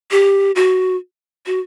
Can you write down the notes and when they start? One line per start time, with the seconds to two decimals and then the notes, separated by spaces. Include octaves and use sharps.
0.11 G4
0.56 F#4
1.46 F#4